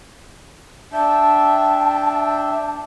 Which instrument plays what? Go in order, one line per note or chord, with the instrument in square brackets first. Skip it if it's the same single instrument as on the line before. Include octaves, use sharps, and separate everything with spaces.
[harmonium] D4 E5 G5 [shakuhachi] A5